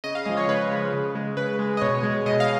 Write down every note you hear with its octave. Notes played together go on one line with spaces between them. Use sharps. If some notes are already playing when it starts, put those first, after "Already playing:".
C#3 D#5
F5
F3 G#3 D#5
C#5
C#3 B4
F3 G#3
C#3
G#3
C#3 B4
G#3
D#5
B2 C#5
G#3
B2 D#5
F5